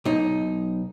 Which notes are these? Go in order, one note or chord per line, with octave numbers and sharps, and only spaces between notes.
B1 D#4